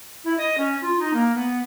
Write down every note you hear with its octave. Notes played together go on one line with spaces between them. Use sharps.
E4
D#5
C#4
F4
D#4
A#3
B3